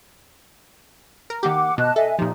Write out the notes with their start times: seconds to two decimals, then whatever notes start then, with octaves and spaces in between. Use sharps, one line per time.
1.30 A#4
1.43 D#3 A#3 G4 F#5 D6
1.78 B2 D#5 A5 F#6
1.96 A4 D#5 E5 G#5
2.19 A#2 F3 D#4 G4